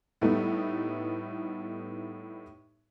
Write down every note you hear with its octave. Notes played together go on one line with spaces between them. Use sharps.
A2 G3 A3 B3 D#4